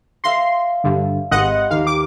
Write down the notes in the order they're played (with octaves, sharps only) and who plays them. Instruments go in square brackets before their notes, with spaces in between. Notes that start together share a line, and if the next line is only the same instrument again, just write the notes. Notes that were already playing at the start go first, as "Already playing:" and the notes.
[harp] E5 F5 A#6 [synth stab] C6
[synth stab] G2 D3
[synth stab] G#1 D#5 F#5 [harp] G4 B4 C5
[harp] D#2 [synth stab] F5
[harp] G4 [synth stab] D6